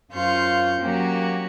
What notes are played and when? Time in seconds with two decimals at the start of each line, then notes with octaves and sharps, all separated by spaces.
0.12 F#2 F4 C5 F5 C#6 G6
0.80 F#3 A#3 C#4 F#4 G4